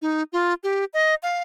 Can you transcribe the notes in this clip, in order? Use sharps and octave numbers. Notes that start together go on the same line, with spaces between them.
D#4
F4
G4
D#5
F5